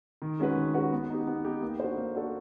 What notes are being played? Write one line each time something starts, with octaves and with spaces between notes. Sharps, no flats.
D#3
G#3 C#4 F#4 B4
D#3
G#3 C#4 F#4 B4
B3
D#4 G4
B3
D#4 G4
A#3
D4 F#4 A4 C5
A#3
D4 F#4 A4 C5